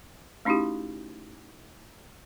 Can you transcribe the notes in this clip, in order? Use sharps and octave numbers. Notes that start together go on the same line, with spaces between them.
A3 C#4 D#4 E4 F#4 G4